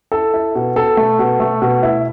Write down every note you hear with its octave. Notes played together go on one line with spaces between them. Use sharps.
E4 A4
E4
B2
B2 A4
A3
B2
A3
B2
E4